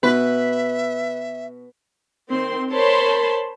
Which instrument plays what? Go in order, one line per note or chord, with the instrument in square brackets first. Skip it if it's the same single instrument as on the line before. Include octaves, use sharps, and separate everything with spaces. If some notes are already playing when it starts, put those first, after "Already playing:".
[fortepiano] B2 [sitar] B4 [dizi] E5
[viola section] D#3 C4 C6
A#4 C5 C#5 A5 B5 C6